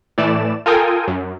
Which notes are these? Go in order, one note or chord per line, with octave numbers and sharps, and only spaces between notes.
A2 E3 A3 D5 E7
F4 A4 A#4 G5 G#5 D#6
F#2